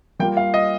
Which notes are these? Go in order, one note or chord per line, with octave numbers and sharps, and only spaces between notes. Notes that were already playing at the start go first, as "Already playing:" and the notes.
G3 A#3 F4 G5
F5
D#5